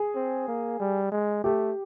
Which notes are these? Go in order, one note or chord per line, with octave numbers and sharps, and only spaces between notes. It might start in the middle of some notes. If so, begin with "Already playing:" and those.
Already playing: G#4
C4
A#3
G3
G#3
A3 G4